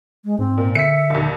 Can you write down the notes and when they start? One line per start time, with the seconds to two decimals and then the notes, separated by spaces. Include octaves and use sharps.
0.25 G#3
0.39 G#2 C4
0.57 A#2
0.75 D3 E5 B6 C#7
1.10 A#1 D#2